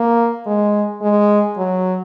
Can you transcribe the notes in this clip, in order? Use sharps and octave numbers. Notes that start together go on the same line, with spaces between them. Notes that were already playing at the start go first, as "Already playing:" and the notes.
Already playing: A#3
G#3
G#3
F#3